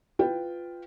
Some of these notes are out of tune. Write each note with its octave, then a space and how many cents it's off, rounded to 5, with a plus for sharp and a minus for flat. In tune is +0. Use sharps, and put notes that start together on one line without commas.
F4 +0 B4 +15 G5 +0